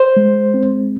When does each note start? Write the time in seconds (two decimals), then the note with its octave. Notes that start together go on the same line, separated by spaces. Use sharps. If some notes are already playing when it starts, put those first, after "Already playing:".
Already playing: C5
0.17 G#3
0.54 C4